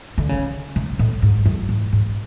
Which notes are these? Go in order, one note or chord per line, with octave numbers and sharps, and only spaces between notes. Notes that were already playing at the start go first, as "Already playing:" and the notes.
D3
C#3
C#3
A2
G#2
F#2
G#2
G#2